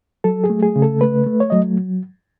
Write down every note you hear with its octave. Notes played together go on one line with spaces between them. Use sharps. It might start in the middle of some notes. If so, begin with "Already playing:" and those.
F#3 A4
G#4
A3
G#4
C#3
A4
A3 B4
A3
C#5
F#3 D#5